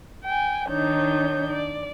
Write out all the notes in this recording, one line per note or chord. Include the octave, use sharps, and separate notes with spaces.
G5 G#5
D#3 D4 D#4 C#5 G6
D5